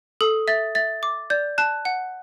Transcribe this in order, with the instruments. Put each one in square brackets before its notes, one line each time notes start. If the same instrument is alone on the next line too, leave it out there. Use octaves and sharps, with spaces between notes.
[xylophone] A4 [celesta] D#6
[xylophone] E5 [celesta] A6
[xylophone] E5 [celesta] A6
[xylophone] D6
[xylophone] D5 [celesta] G6
[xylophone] A5 [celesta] F#6
[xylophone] F#5